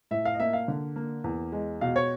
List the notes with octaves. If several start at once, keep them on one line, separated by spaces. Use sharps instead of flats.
A2 E5
F5
D#5
A#3 E5
F5
D3
A#3
E2
G#3
B2 F5
C#5